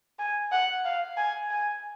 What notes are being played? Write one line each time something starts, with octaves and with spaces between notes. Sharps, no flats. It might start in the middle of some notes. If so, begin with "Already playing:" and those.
G#5
F#5
F5
G#5
G#5